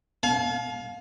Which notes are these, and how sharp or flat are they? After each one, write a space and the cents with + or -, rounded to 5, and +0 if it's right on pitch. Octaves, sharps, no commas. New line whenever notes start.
F5 +20 A5 -45